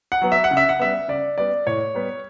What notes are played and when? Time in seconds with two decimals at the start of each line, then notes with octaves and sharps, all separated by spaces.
0.12 F#5
0.22 F#3 B3
0.32 E5
0.44 F#5
0.51 C#3
0.57 E5
0.69 F#5
0.79 G3 B3 E5
1.08 C#3 D5
1.38 G3 B3 D5
1.67 A2 C#5
1.95 G3 B3